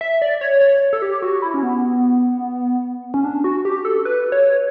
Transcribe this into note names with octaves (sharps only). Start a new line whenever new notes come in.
E5
D5
C#5
C#5
A4
G4
F#4
E4
C#4
B3
C#4
D4
F#4
G4
A4
B4
C#5